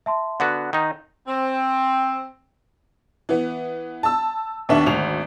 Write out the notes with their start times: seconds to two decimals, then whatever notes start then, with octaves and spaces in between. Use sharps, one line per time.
0.06 E5 A5 C6
0.40 D3 B3 F#4 F#5
0.73 D#3 D#4
1.27 C4
3.29 E3 B3
4.03 A5 E6
4.69 D#2 B3 D4 E5
4.86 G#1 D2 F7